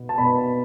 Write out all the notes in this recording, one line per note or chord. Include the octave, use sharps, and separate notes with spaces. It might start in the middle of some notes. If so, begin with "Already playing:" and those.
Already playing: B2 B3
A5
B2 B3 B5